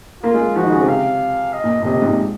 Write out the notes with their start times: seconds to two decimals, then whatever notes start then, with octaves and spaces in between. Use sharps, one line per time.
0.23 A#3 F4
0.34 G#3
0.56 F3 F#4
0.64 D#3
0.72 C#3
0.79 C3
0.88 F5
1.53 D#5
1.64 A#2
1.81 A#2
1.85 C3 D#5
1.96 C3
2.02 G#2
2.07 A#2